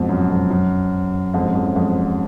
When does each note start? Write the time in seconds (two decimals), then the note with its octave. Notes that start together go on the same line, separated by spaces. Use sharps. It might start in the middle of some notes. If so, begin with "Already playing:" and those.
Already playing: F2 G#2 B2
0.09 F#2
0.30 F2
0.50 F#2
1.34 F2 G#2
1.45 F#2
1.55 F2
1.66 F#2
1.76 F2 G#2